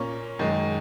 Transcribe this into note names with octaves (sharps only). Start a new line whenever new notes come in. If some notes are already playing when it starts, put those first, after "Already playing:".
Already playing: A#2 A#3 C#4 C#6
F#2 D#3 G#3